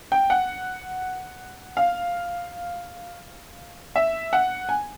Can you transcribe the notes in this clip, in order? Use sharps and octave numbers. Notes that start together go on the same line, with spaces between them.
G5
F#5
F5
E5
F#5
G#5